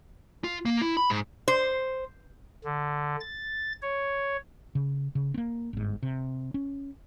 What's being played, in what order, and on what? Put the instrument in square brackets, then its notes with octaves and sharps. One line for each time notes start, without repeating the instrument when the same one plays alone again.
[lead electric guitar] F4
A#3
E4
B5
G#2
[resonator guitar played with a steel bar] C5
[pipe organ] D3
A6
C#5
[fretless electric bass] C#3
C#3
A#3 C4
G1 G#2
C3
C#4